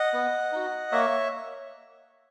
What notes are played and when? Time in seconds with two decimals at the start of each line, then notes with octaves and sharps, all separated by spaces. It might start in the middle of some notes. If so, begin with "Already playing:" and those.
Already playing: D#5 F#5
0.13 B3
0.52 D#4 F#4
0.92 A#3 C#5 E5